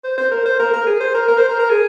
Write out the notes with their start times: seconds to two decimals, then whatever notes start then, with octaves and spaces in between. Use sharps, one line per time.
0.04 C5
0.18 C5
0.31 A#4
0.45 C5
0.59 A#4
0.73 A#4
0.87 G#4
1.00 C5
1.14 A#4
1.28 A#4
1.38 C5
1.49 A#4
1.59 A#4
1.69 G#4